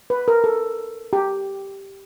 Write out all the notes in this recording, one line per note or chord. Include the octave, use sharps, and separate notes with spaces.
B4
A#4
A4
G4